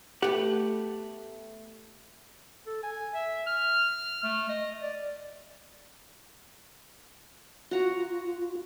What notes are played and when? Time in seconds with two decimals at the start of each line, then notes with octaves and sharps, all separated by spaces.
0.22 A3 B3 G4 F#5
2.67 A4
2.83 G#5
3.14 E5
3.47 F6
4.23 A3
4.49 D#5
4.82 D5
7.71 F4 F#4 A#5